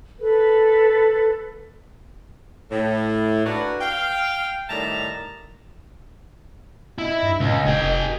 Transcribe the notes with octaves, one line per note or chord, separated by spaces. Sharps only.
A4 B4
A2
A#3 D4 F#4 A#4 B4
F5 G5
A2 D#3 G3 E5 A5 A#5
E4 D#5
G2
C#2 A#2
F1 G#4 G5